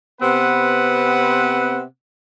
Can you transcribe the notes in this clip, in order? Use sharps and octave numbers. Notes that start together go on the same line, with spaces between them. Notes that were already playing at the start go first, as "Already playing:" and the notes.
C3 B3 C4 B4 F#5